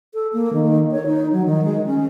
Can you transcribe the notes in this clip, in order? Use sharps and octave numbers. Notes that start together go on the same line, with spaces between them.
A4
A#3
D#3
C#5
D#4
F#3
D#3
G#3
C#4